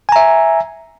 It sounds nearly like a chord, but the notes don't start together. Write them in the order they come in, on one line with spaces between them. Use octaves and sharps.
G#5 A#5 E5